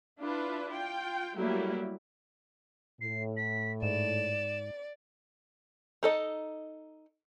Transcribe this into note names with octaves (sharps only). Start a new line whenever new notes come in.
D4 E4 F4 B4
F4 G5
F#3 G3 A3 A#3 E4 G4
A2 C7
B6
G#2 D5 E7
D#4 A4 D#5